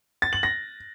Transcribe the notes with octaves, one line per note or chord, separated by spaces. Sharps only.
A6
F#7
A#6